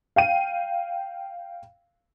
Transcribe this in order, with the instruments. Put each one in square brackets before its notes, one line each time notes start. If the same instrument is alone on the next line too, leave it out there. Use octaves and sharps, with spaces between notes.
[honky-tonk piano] F5 G5 D#7